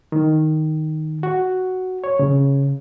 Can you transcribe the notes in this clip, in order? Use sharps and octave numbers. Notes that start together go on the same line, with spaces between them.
D#3
F#4
C#5
C#3